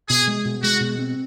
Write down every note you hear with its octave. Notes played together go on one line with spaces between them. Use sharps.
B2 G#4
G#3
B2
G#3 F#4
B2
C4